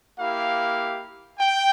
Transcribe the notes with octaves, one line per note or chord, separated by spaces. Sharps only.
A#3 E4 G4 F5
G5